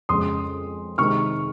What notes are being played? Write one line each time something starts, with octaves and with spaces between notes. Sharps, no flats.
F2 C#3 G#3 C#4 C6 D#6
C3 D#3 G#3 D#4 C#6 F6